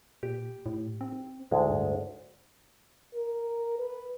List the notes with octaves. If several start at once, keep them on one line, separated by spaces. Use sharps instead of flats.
A#2 G4
A2
C4
D2 A2 G#3
G2
A#4
B4